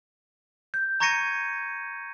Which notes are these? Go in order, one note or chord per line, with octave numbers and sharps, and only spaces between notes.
G6
A#5 C#6 G#6 A#6 C#7 D#7